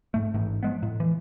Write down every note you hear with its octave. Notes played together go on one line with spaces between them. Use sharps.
G#2 A3
A1 G#2
F3 G#3 B3
A2
E3